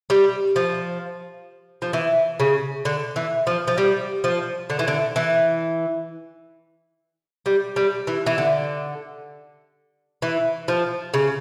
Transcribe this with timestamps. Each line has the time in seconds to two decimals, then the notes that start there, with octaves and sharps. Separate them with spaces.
0.10 G3
0.56 F3
1.82 F3
1.93 E3
2.40 C#3
2.85 D3
3.16 E3
3.47 F3
3.68 F3
3.78 G3
4.24 F3
4.70 D3
4.79 E3
4.88 D3
5.16 E3
7.46 G3
7.76 G3
8.07 E3
8.26 E3
8.38 D3
10.22 E3
10.68 F3
11.14 C#3